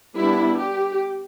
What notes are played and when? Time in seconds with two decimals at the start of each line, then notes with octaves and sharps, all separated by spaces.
0.17 G3 B3 D4 E4
0.60 G4